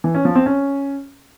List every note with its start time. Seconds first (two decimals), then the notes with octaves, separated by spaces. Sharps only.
0.04 E3
0.14 C#4
0.25 F3
0.35 C4
0.46 C#4